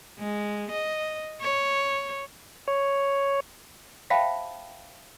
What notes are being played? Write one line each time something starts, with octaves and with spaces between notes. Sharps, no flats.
G#3
D#5
C#5
C#5
C5 E5 F5 G5 A5 B5